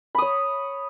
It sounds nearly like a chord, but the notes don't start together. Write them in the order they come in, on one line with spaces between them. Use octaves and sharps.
B5 D#6 C#5